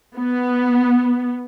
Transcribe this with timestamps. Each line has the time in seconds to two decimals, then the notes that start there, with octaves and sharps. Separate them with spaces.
0.18 B3